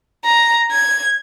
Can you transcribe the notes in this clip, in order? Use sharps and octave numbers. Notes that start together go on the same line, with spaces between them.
A#5
G#6